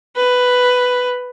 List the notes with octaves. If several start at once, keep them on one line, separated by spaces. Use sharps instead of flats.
B4